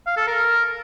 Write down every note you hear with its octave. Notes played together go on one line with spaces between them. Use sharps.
F5
A4
A#4